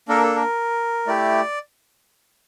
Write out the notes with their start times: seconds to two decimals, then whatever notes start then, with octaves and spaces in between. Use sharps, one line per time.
0.08 A#3 D4 A4 A#4
0.23 A4
0.35 A#4
1.07 A3 E4 G4 D5